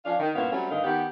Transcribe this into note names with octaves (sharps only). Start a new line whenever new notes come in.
F3 C#4 D4 F5
D#3
G2 A#2 B3 C#4 E4 F5
F#3 G3 A3 C4 C#4
G2 D3 D#3 D#5 F5
D#3 B3 G4